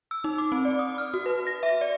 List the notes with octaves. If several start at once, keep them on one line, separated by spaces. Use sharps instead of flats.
E6
D#4
D6
C4
D5
D#6
F6
F#4
B4
A#6
E5
D5